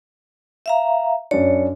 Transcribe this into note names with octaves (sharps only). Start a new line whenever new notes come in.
E5 F5 A#5
F#2 D4 C#5